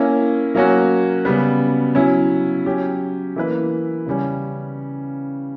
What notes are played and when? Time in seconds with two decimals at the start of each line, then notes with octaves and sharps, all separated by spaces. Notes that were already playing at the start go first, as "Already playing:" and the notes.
Already playing: A#3 C#4 E4
0.55 F#3 A#3 C#4 F#4
1.25 C#3 G3 B3
1.95 F#3 C#4 E4
2.65 F#3 C#4 G4
3.36 E3 A#3 E4 B4
4.06 C#3 G3 C#4